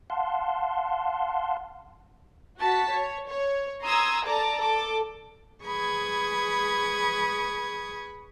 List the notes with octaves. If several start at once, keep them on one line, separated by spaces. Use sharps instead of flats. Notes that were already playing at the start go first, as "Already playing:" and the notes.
F5 F#5 A5 C6
F#4 A5 B6
C#5
C#5
A#5 C6 D#6 E6 G#6
A4 D5 A5 A#5 D6
A4 D6
G#4 B4 B5 C#6 D#6 G#6